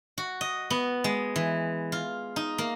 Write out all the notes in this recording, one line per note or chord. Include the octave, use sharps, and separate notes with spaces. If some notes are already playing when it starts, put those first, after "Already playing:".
F#4
D#5
B3
G#3
E3
F4
D#4
A#3